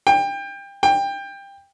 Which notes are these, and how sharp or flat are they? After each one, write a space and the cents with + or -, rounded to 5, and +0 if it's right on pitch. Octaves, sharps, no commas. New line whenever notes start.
G5 +25
G5 +20